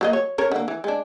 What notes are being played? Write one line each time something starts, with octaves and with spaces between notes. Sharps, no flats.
F#3 A#3 D#5
C#5
C#4 A#4 C#5
D3 A#3
E3
G#3 D4